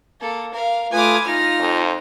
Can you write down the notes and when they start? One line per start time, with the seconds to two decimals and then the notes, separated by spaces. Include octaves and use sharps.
0.21 A#3 A4
0.53 A#4 F5
0.93 A3 F4 B4 G#5 B5 D6 D#6 F6
1.25 D#4 F4 F6 A#6
1.60 F2